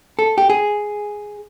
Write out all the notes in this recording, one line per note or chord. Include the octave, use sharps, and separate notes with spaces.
A4
G4
G#4